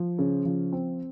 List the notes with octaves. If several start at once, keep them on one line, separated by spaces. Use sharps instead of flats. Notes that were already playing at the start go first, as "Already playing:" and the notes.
Already playing: F3
C#3
F3
C4